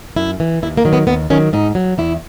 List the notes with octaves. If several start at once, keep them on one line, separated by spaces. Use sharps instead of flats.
F#2 E4
E3
D#2 E4
A#3
D#3 F#3
B3
D#2 B3
D#3 F#3 C#4
G#2 D#4
F#3
E2 E4